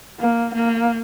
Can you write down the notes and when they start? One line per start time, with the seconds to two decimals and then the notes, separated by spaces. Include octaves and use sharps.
0.20 A#3
0.55 A#3